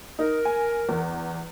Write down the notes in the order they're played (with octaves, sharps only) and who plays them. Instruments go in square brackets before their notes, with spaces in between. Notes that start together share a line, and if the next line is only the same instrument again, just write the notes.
[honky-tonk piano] D#4 [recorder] A#4
[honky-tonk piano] G#5
E2